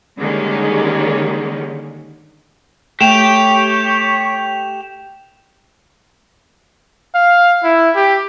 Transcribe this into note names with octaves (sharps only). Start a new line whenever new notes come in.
D3 D#3 G3 G#3 A#3 C#4
A3 G4 C#5 G5 E7 F7
F5
E4
G4